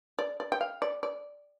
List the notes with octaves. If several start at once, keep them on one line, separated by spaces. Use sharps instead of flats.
D5
D5
G5
F5
D5
D5